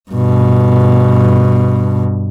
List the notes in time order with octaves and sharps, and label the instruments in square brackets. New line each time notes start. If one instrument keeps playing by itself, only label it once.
[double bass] G2 B2